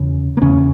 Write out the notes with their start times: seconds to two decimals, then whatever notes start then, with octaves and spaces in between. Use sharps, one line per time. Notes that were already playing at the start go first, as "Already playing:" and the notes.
Already playing: E2 C#3
0.37 A#3
0.42 E2 C#3 C#4